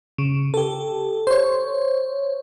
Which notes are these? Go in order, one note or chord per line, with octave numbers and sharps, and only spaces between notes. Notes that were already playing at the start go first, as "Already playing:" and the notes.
C#3
G4 A4
C5 C#5